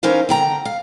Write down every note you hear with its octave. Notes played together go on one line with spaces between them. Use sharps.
E3 C#4 D#4 A#4 C5 F5
D3 G5 A#5
F5